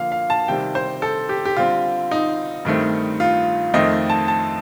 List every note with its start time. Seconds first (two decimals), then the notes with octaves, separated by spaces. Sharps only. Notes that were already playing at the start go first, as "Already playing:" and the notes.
Already playing: D3 F3 A#3 F5
0.12 F5
0.30 A5
0.48 C3 D#3 G3 C4 G5
0.75 C5
1.02 A4
1.29 G4
1.45 G4
1.57 D3 G3 C4 F4
2.11 D#4
2.65 G2 D#3 A3 C4
3.20 F4
3.74 F2 D#3 A3 C4 D#5
4.10 A5
4.28 A5